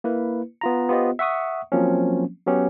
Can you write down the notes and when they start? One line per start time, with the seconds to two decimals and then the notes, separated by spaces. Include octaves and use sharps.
0.04 A#3 E4 B4
0.61 B3 F4 A#5
0.89 B3 F4 G4 C5 D#5
1.19 E5 F#5 C#6 D#6
1.72 F3 F#3 A#3 C4 C#4
2.46 F#3 B3 C#4 G4